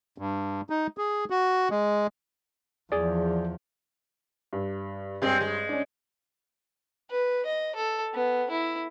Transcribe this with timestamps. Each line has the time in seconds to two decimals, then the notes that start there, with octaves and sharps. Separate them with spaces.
0.18 G2
0.70 D#4
0.98 G#4
1.30 F#4
1.71 G#3
2.92 E2 F3 G#4 D5
4.53 G2
5.22 G2 G#3 C4 G#4
5.41 G#3
5.69 C#4 D4
7.10 B4
7.46 D#5
7.76 A4
8.14 B3
8.51 E4